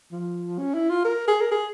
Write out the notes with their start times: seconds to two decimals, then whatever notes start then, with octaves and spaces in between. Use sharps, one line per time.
0.12 F3
0.58 C#4
0.74 E4
0.90 F4
1.05 A#4
1.28 G#4
1.41 A#4
1.51 G#4